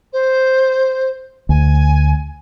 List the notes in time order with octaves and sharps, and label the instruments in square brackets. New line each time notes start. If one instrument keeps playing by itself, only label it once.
[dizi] C5
[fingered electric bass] D2 [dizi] G#5